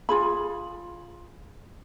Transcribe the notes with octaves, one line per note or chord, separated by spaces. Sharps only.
F4 G#4 B5